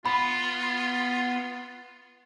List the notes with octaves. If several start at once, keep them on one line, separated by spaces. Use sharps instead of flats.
B3 F4 B5